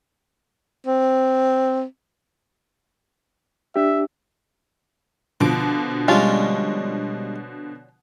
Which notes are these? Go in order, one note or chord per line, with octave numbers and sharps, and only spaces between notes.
C4
D4 G4 E5
B2 D3 F3 D6
G3 G#3 C#4 D4 F4